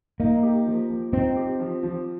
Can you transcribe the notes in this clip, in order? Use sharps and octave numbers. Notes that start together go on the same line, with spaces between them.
A#3 D#4
G4
F3
F3
C4 D#4
G4
F3
F3